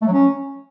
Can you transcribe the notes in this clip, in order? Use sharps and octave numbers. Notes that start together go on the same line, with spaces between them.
A3
F#3
C#4